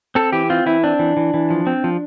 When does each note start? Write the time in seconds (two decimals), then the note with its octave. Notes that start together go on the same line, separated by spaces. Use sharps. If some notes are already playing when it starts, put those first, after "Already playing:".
0.15 C4 A4
0.33 E3 G4
0.50 C4 F4
0.66 E3 E4
0.83 C4 D4
0.99 E3
1.17 E3
1.34 E3
1.50 F3
1.67 C4
1.84 F3